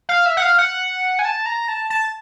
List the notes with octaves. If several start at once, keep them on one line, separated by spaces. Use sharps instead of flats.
F5
E5
F#5
F5
F#5
G#5
A5
A#5
A5
A5